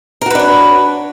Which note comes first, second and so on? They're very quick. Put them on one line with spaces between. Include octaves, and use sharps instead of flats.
A#4 F#4 B4 D4 C#5